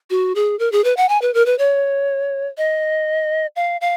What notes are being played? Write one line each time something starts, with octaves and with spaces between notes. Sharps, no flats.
F#4
G#4
A#4
G#4
B4
F#5
G#5
B4
A#4
B4
C#5
D#5
F5
F5